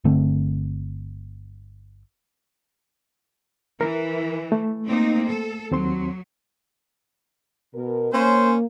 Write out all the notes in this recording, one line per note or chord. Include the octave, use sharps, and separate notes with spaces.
G1 D3 A3 C4
E3 A#4
A3
A#3 C4 D#4
A4
D#2 F#3 C4 C6
B2 A#4
A#3 C#4 C5